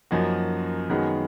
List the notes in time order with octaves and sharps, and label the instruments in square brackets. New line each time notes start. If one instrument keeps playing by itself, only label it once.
[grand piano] F#2 F3 A#3 D#4 F#4
F#2 D#3 G#3 B3 F#4